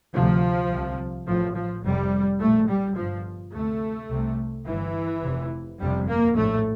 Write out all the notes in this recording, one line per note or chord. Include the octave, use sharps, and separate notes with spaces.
D2 C3 F3
C2 C3
A1 A2 F3
F3
F1 F2 C3 G3
A#1 A2 A3
G3
G1 G2 F3
D2 C3 A3
C2 C3
G1 G2 E3
F1 F2 C3
G1 F2 C3 G3
A#3
A#1 A2 A3